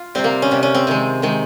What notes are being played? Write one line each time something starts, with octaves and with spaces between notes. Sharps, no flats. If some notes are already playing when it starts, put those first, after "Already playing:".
Already playing: F4
C3 G3 C4
A#3
C#4
C3 G3
C#4
C4
C3 D#3 G#3
C3 D#3 G#3